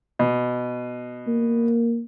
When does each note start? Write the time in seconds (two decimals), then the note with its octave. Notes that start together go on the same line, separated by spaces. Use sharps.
0.19 B2
1.27 A#3